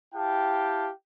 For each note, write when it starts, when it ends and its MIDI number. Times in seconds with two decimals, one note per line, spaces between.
0.14 0.90 64
0.14 0.90 67
0.14 0.90 77
0.14 0.90 79
0.14 0.90 81